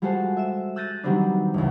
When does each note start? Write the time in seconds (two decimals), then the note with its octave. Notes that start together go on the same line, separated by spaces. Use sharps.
0.02 G3 G#3 F4 F#4 A4 C5
0.37 E5 E7
0.76 E6 F#6 G6 A6 A#6 D#7
1.04 D#3 F#3 G3 B3 C4 D4
1.54 E1 C#2